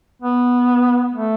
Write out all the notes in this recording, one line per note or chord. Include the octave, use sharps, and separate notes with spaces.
B3
A3